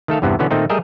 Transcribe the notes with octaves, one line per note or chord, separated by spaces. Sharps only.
D#3 A3 A4 F5
E2 G2 C3 E3 B3
B2 D3 E3 B3 C#4
A#2 D#3 A3 C4 D#4
G3 A3 G#4 A#4 D#5 E5